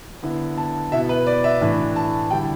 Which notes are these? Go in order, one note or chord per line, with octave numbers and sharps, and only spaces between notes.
D3 B3 E4
A5
B2 B3 E4 E5
B4
D5
E5
A2 E3 A3 D4
A5
D3 G3 E4 G5